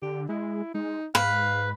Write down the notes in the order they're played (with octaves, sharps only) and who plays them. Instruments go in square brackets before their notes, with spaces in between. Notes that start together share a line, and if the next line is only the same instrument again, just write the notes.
[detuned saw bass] D3 [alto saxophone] G4
[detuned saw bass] G#3 [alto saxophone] E4
[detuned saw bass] G#3 [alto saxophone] D#4
[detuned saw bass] G#2 [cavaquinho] B4 [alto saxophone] F5